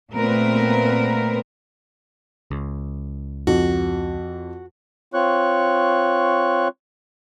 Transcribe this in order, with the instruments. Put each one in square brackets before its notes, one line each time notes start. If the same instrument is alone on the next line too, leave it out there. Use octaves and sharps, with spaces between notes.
[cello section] A#2 A3 B3 C4 A#4 B4
[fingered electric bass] C#2
[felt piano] F2 [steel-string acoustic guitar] F#4
[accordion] C4 F4 C#5 C#6 F#6